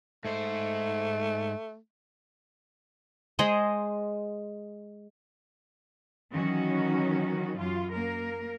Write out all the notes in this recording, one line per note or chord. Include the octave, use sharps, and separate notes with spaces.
G#2 A3 C5
G#3 G#4 C5 D#5
D#3 E3 F#3 C#4 F#4
F#2 F4
A#3 A#4